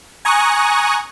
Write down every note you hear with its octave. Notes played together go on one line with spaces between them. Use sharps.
G#5 A#5 C#6 D#6 F#6